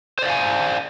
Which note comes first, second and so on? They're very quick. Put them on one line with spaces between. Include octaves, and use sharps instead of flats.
C5 D5 F5 G#5